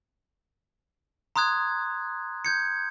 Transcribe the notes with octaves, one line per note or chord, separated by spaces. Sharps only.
A#5 C6 D#6 F#6 G#6
G6 G#6 C#7